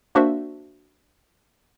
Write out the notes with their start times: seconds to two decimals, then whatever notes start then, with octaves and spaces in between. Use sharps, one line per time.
0.15 A#3 D4 F#4 C5 E5